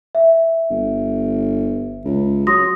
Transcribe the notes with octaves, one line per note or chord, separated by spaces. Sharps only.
E5
G1
C#2
F#3 C6 D#6 A#6